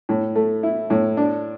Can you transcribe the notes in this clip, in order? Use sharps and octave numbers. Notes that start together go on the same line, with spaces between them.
A2
A3
E4
A2
D4